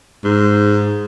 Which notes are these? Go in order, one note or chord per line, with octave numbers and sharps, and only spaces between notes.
G#2